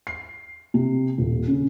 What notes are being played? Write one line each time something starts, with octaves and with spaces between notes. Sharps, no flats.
C7
C3
D#1
C#3